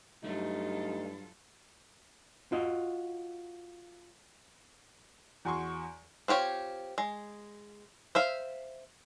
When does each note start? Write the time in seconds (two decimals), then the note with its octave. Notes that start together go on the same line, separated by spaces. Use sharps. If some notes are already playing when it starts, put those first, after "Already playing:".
0.24 G2 F#3 G3 A3 D#4 F4 A4
2.52 F4 F#4 D#5
5.45 E2 F#4 G#5 C6 C#6
6.28 C4 F4 G4 C#5
6.98 G#3
8.15 C5 E5 F5